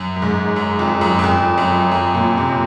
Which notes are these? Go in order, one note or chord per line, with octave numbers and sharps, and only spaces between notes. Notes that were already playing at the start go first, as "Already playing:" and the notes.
Already playing: F#2
F#2
G#2
F#2
F2
F#2
F#2
F2
F#2
F#2
A#2
C3